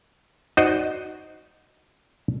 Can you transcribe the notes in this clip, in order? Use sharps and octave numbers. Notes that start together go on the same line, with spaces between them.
D#4 F#4 C5 D5 D#5